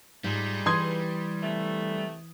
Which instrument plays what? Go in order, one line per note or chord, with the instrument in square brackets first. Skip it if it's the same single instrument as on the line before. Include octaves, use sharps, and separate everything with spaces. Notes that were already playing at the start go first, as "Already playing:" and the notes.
[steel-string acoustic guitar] G#2 [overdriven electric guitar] G3 [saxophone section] D#4 F4 G#4
[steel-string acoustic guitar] E3 [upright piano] C6 D#6 G#6
[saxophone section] C3 A3